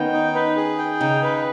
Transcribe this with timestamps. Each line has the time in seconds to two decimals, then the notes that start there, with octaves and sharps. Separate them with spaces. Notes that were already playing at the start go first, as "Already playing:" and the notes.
Already playing: D#3 B3 C#4 G5
0.13 D#4
0.35 B4
0.57 G#4
0.78 G5
1.00 C#3 D#4
1.23 B4